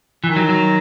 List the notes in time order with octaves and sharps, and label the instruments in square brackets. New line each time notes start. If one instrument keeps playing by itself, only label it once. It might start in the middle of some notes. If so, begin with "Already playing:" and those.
[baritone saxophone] D#3 [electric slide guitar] E3
[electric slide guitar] F#3
F#3